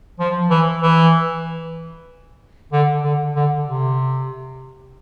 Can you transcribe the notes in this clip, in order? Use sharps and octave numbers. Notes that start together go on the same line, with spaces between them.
F3
E3
E3
D3
D3
D3
C3